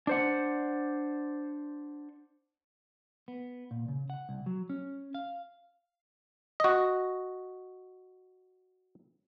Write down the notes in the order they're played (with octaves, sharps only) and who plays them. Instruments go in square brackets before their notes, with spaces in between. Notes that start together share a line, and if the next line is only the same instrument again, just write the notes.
[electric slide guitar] D4 C5 F#5
[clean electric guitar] B3
A#2
C#3
F#5
C2
F#3
C#4
F5
[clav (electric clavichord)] F#4 D#5